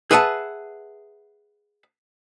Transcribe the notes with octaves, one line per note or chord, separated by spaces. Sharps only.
G#4 B4 E5 F#5 G5 A5